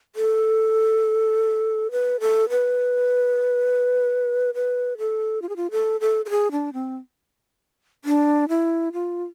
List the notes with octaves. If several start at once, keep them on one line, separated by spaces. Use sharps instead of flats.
A4
B4
A4
B4
B4
A4
F4
G#4
F4
A4
A4
A4
G#4
D4
C4
D4
E4
F4